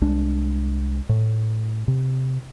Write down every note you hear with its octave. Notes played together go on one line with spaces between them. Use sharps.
C2 G#3 D4
A2
C3